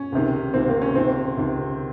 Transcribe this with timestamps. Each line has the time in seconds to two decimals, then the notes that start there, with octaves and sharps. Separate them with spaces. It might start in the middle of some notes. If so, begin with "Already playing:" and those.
Already playing: C#4
0.12 C#2 C3 D#3
0.54 C#2 C3 D#3 C4
0.68 A#3
0.82 C#4
0.95 C#2 C3 D#3 C4
1.37 C#2 C3 D#3